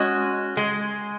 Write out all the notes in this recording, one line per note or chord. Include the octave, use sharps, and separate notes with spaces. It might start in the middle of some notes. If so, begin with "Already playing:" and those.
Already playing: G#3 C#4 F#4
G#3